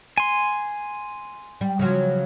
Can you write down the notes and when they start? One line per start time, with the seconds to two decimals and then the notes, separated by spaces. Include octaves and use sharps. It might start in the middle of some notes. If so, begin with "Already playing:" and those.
0.18 G#5 C6
1.61 G3
1.79 C#3 F3 F#3